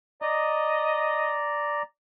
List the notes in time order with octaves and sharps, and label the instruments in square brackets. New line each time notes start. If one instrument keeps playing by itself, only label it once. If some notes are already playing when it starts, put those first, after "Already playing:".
[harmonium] D5 A#5 [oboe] D#5